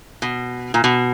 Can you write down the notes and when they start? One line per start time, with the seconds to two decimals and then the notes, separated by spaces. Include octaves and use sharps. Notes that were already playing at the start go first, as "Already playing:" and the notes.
0.22 B2
0.74 A#2
0.84 B2